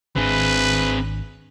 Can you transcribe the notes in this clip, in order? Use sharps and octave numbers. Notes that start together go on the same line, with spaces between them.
G#1 C4 D4 G#4 B4